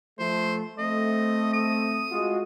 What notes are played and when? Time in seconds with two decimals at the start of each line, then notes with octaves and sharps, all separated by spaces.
0.19 F3 A3 C5
0.78 A3 C4 D#5
1.53 D#6
2.11 G#3 F4 F#4